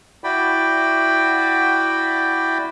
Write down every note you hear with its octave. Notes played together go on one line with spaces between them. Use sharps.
E4 F#4 D5 G5 B5